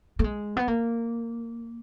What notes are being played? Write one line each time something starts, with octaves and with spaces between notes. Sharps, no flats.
A3
G#3
B3
A#3